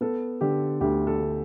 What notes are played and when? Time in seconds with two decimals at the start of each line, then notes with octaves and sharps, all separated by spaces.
0.01 B3 A4
0.41 D3 G4
0.81 D2 G4
1.07 A4
1.20 D3